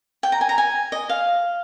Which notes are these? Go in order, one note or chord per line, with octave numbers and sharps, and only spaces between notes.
G5
A#5
G#5
A#5
G#5
D#5
F5